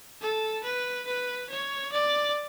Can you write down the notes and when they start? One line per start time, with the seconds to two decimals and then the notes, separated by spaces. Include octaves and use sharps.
0.22 A4
0.64 B4
1.07 B4
1.50 C#5
1.93 D5